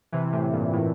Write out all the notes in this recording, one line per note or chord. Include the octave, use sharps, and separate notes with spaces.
C3 E3
A2 C3
G2 A#2
A2